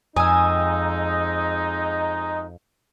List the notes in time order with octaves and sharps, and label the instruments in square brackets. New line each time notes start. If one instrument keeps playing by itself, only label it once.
[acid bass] F2 [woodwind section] G#3 D#4 [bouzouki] G#5 [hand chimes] D#6 E6